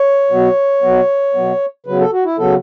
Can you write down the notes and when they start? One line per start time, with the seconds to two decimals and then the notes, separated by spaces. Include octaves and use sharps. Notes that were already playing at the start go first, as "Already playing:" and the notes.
Already playing: C#5
0.30 B2 F#3 B3
0.82 B2 F#3 B3
1.34 B2 F#3 B3
1.86 C#3 F#3 B3 B4
1.99 A4
2.12 F#4
2.25 E4
2.38 C#3 F#3 B3 A4